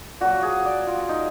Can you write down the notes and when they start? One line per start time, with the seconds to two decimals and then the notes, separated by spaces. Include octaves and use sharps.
0.20 A#2 F#3 A#3 F#4
0.43 G#4
0.65 D5
0.87 F4
1.09 D#4